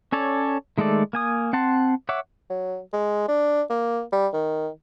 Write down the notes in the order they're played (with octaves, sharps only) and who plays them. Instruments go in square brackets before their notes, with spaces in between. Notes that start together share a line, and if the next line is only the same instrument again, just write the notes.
[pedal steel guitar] C#4 A4 C#5 D5
D#3 G#3 A3 A4 D5
A#3 G#5 D#6
C4 F#5 A5 C6
C#5 E5 F#5 D6
[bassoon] F#3
G#3
D4
A#3
G3
D#3